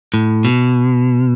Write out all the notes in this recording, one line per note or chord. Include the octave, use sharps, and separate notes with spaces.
A2
B2